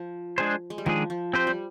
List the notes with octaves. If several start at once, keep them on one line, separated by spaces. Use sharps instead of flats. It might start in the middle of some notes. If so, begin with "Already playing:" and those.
Already playing: F3
G#3 D4 G#4 C5
G#3
G3
D#3 F3 G#3 D4 G#4
F3
C4 G4 C5
G3